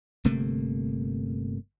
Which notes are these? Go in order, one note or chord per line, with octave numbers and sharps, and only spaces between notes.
G1 C3 A3 A#3